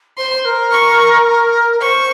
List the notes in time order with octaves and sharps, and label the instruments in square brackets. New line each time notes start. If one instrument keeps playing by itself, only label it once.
[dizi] C5 [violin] C6
[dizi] A#4
[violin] C#6
[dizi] A#4
[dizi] C5 [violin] C#6